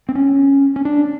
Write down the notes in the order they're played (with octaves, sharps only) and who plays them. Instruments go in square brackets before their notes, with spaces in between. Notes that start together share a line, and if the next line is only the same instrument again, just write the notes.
[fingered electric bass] C4
C#4
C#4
D4